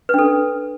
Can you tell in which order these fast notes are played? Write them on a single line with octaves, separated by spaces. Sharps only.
B4 D4 A4